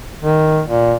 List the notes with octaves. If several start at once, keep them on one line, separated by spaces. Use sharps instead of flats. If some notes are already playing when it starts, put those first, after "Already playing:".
D#3
A#2